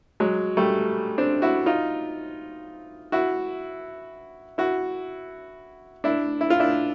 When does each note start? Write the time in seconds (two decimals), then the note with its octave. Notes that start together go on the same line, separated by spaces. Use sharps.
0.20 F#3 G#3
0.57 G3 A3
1.18 C4 D4
1.42 E4 F#4
1.66 D#4 F4
3.12 E4 F#4
4.58 E4 F#4
6.04 D4 E4
6.41 E4
6.50 F4
6.60 D4 E4